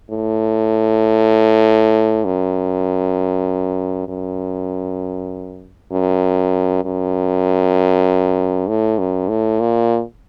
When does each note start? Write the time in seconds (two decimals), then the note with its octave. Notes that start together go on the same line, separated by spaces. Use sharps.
0.10 A2
2.25 F#2
4.08 F#2
5.92 F#2
6.85 F#2
8.68 A2
8.99 F#2
9.28 A2
9.60 A#2